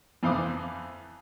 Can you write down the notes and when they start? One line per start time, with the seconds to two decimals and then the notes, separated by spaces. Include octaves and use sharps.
0.23 F2 E3 C5 F5 D6 D#6